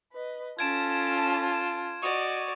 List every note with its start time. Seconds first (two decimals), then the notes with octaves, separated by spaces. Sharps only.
0.12 B4 D#5
0.59 C#4 F4 A4 A5 G#6 D7 E7
1.18 E7
2.02 F#4 D5 D#5 C#6 D#6